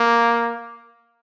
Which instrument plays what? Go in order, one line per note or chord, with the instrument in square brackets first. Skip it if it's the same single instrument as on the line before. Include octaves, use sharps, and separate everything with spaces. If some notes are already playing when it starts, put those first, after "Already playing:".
Already playing: [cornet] A#3